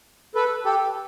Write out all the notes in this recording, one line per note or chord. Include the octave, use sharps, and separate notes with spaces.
A4 B4
G4 A4